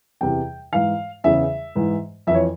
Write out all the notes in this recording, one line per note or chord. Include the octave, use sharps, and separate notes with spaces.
E2 C3 E3 G5
G#2 E3 F5
E2 C#3 E3 E5
G#2 E3
F2 E3 C#5 E5